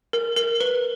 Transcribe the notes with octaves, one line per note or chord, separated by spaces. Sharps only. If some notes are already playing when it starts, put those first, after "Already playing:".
A#4
A#4
B4